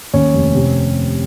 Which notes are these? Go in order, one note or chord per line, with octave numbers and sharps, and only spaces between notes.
D#2 C#4 C#5
F1
C3